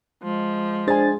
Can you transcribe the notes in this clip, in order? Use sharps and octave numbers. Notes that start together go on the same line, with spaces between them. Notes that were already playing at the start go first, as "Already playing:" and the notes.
F3 G#3
D4 G#4 C5 G#5 A6